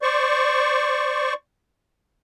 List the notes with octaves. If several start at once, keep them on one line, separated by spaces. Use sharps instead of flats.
C5 D5 C#6